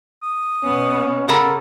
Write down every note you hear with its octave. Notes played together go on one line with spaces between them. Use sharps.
D#6
B2 B3 C#4
C#3 A4 A#4 F#5 A#5 B5